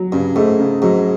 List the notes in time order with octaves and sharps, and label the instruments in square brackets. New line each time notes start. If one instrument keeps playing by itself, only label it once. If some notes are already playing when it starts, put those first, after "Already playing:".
Already playing: [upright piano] F#3
[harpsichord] G2 [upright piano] C#3
[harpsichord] G#2 [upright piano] A3
[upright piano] C#3
[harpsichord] G#2 [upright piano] F#3